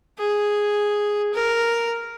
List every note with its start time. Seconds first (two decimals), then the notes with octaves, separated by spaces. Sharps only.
0.18 G#4
1.33 A#4